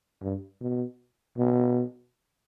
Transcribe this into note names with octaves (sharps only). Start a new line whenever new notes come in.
G2
B2
B2